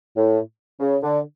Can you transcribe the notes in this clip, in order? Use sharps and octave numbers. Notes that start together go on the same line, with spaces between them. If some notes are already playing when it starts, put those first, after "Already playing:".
A2
C#3
D3